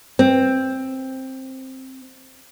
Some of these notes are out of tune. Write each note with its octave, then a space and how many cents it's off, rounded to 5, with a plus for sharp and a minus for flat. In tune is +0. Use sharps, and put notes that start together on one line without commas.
C4 +10